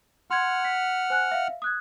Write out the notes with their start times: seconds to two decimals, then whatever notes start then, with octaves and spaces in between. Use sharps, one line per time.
0.31 F#5 C6 F6 G#6
0.65 B6
1.10 C5 G#5 F#6
1.32 E5 F5
1.62 D#6 F#6 G#6